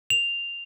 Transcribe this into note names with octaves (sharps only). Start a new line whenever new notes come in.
F7